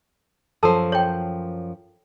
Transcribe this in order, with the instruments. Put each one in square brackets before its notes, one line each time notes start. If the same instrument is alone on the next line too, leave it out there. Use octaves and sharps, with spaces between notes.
[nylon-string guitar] F#2 F3 C5 [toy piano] A4 A5 E6
[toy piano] C#5 G5